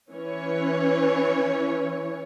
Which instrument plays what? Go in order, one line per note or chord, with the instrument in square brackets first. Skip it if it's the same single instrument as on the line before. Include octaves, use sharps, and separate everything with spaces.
[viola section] E3 C#4 C#5